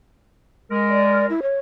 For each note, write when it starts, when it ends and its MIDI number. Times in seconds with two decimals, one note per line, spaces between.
0.71 1.30 56
0.71 1.30 70
0.90 1.26 74
1.30 1.40 64
1.42 1.59 73